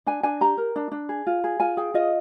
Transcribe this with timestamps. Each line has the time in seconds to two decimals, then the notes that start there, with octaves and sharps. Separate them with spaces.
0.06 D4 G#5
0.23 D4 G#5
0.41 G4 A#5
0.57 A#4
0.76 D4
0.91 D4
1.09 G#4
1.26 F4
1.44 G#4
1.60 F4 G#5
1.77 G#4 G5
1.94 F4 D#5